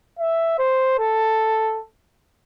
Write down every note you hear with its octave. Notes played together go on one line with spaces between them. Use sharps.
E5
C5
A4